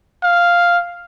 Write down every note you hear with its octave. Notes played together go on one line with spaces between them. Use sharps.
F5